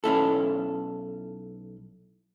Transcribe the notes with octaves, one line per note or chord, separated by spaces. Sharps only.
B1 C#4 E4 A4